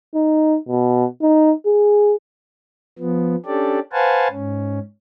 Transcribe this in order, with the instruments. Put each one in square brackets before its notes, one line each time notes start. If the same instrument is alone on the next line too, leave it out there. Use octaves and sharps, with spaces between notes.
[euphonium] D#4
B2
D#4
G#4
[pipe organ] F3 B3
C#4 D4 G4 A4 D5
B4 C5 F5 F#5 G#5 A5
G#2 C#4